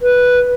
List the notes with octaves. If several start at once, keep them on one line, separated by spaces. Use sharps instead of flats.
B4